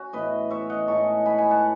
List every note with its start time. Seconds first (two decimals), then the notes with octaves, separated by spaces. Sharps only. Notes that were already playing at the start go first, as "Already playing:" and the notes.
Already playing: C#4 F#4
0.13 A2 E3 B3 B4 D#5
0.50 C#5 E5
0.70 D#5 F#5
0.88 A2 G#3 D#4 A5 C#6
1.26 G#5 B5
1.38 G#5 B5
1.51 F#5 A5